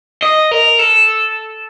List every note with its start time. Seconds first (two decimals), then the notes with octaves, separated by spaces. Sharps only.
0.22 D#5
0.51 A#4
0.79 A4